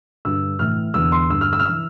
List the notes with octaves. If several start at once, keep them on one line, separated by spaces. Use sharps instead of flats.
G2 D3 E6
A2 E3 F6
E2 D3 E6
C6
G2 D3 E6
F6
E6
F6
E3 E6